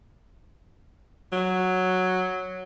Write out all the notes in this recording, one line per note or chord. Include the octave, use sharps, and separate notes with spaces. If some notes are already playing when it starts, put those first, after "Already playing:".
F#3